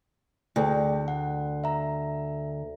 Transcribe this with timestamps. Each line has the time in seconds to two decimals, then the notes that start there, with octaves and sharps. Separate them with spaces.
0.56 D2 G#4 G5
1.08 F#5
1.64 E5 A#5